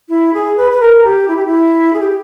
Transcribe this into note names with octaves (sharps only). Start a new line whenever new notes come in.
E4
G#4
B4
B4
A#4
G4
E4
G4
E4
G#4
G4